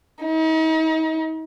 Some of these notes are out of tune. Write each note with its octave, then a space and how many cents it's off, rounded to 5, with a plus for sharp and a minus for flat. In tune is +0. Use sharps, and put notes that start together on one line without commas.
D#4 +40